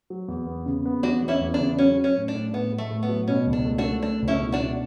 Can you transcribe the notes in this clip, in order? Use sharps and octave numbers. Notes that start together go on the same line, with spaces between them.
F#3
E2
B3
C#3
B3
E2 D4 F#4
E2
C#4 E4
E2
D4
C#3
F#3 C#4
F#3
C#4
A2
D4
A2
A2 B3
A2
A3
A2
B3
F#3
B2 C#4
C#2
D4
A3
D4 F#4
A3
A3 D4
C#2
C#4 E4
B2
D4 F#4
B2